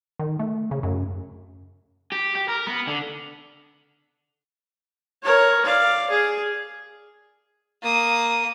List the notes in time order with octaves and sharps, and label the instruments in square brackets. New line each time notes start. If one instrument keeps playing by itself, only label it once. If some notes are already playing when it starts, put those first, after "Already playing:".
[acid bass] D#3
A3
C#3
F#2
[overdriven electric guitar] G4
G4
A#4
B3
D3
[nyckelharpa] A#4 C#5
D5 F5
G#4
[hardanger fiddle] A#3 D#6